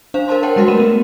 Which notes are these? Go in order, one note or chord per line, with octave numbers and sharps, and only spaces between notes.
D4 C5 F5
A#4 C5 A5 C6
A#4 C#5 F#5 G5 A5 C6
G3 G#3 F#4 A#4 B4 C6
A3 F#5 B5 D#7 E7
B3